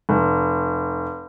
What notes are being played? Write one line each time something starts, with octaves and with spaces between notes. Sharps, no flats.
F1